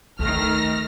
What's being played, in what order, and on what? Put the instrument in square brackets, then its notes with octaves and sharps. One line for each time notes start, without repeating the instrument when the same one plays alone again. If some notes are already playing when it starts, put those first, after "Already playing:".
[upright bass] D2 D3 [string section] D#3 A3 [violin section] F6 A#6